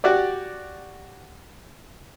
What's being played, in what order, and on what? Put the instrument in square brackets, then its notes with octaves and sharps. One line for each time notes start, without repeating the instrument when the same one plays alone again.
[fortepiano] F#4 G4 D5